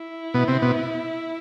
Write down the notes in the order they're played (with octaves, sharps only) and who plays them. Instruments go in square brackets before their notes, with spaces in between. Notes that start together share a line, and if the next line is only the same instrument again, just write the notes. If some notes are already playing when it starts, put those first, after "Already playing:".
Already playing: [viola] E4
[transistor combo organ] B2 B3
C3 C4
B2 B3